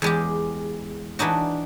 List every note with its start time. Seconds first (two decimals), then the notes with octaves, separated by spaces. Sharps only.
0.02 E2 G#3 G4
1.19 E3 D4 D#4 F#4